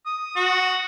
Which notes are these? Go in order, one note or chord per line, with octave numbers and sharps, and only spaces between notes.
D#6
F#4